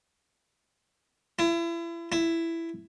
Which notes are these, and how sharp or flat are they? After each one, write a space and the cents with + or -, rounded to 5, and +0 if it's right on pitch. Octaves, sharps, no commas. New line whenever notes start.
E4 +35
E4 +10